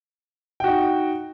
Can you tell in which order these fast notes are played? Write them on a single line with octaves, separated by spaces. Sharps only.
G5 F#4 D#4